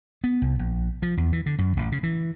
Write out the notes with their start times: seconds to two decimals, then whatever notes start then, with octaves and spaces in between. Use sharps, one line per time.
0.24 B3
0.42 C2
0.59 A#1
1.02 F3
1.17 E2
1.33 E3
1.46 D3
1.58 F#2
1.77 A1
1.92 C#3
2.03 E3